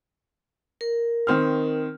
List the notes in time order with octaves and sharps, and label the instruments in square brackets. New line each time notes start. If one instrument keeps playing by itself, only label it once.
[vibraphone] A#4
[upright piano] D#3 C4 F6